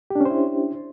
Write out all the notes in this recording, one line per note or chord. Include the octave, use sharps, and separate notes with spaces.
C#4 D4 E4 G4 C5